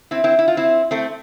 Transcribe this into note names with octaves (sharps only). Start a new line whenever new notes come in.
C4 E4
C4 E4
E4
F4
C4 E4
A3 C4